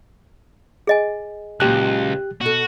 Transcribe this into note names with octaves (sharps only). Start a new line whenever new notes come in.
G#4 D#5 G#5
C#2 A#2 F#3 G4 A5 F#6
B2 F#4 A4